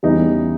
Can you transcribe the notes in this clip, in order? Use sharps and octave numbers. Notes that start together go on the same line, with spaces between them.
E2 C#3 E3 G3 D#4